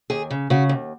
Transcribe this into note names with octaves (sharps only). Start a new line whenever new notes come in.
D#2 G#4
C#3
C#3 F#4
D#2